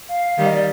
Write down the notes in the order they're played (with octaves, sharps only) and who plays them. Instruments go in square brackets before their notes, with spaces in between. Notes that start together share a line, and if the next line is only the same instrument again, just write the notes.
[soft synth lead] F5
[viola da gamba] D#3 G3 [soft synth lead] F5
[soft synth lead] D#5
D5